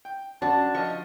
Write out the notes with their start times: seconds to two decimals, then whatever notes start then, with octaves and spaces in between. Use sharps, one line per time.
0.05 G5
0.42 F#2 D4 F#4 A5
0.75 F3 D#5 C#6